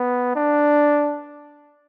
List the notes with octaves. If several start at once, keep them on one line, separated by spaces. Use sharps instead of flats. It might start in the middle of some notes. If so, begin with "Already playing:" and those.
Already playing: B3
D4